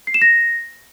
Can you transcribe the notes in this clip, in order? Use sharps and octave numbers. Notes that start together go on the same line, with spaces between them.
C7
E7
A#6